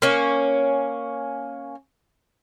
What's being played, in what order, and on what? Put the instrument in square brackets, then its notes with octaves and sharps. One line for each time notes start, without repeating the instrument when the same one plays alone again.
[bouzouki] A#3 C#4